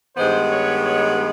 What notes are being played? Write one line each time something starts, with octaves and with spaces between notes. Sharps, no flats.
G2 D#3 G#3 B3 C5
C#5
C#5